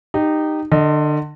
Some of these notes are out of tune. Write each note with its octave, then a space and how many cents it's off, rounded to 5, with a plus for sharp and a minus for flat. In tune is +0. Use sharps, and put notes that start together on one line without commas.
D#4 -15 G4 +0
D3 +30 D#5 +0